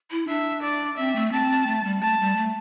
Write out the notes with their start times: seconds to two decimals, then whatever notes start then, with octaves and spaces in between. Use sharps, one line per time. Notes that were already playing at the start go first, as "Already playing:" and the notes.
0.11 E4
0.28 D4 E5
0.63 D5
0.97 C4 E5
1.16 A3
1.33 C4 A5
1.67 A3
1.84 G3
2.02 A3 A5
2.20 G3
2.36 A3